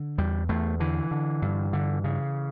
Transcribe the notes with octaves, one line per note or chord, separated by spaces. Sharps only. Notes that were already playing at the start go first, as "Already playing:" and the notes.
Already playing: D3
E2 G3
E2 A3
D3 E3
D3
G2
D3
C#3